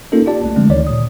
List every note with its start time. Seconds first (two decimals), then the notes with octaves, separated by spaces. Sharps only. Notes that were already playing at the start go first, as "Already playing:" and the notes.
0.12 A#3 C#4 D#4 F4 A4 A#4
0.26 F4 G4 D5 A5
0.44 B1 A3
0.56 D3 F3 G#3 A3 C4 D4
0.69 D2 D#3 C#5 D5
0.87 A#2 D#6